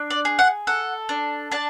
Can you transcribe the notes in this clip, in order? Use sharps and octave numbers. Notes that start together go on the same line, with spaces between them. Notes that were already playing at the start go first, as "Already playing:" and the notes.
Already playing: D4
D5
G#4
F#5
A4 F#5
D4
D4 A5